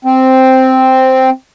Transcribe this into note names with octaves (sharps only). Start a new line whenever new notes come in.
C4